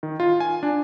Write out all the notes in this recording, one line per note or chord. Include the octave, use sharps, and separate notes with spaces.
D#3
F4
G#5
D4